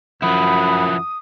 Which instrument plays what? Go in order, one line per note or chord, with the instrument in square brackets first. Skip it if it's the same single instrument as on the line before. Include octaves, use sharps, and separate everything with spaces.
[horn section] F#2 F#5 [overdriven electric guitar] F3 E4 [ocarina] B5 [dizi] D#6